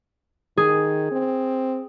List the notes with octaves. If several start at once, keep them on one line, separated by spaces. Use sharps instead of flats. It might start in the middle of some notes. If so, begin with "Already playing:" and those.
D#3 G#4
C4